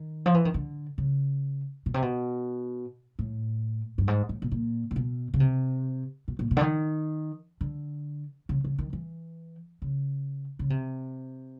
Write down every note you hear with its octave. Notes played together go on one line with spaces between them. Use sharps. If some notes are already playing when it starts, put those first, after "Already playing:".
Already playing: D#3
F3
E3
D#3
D3
C#3
B2
C3
B2
A2
G2
G#2
A2
B2
A#2
A#2
B2
C#3
C3
B2
A#2
B2
D3
D#3
D3
C#3
C#3
D#3
E3
C#3
C#3
C3